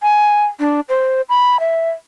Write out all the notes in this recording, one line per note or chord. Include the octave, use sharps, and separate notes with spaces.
G#5
D4
C5
B5
E5